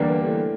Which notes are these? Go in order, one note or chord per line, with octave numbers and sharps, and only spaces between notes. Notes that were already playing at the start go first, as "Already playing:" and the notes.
Already playing: E2 G2 D3 G3 A#3 D4
A2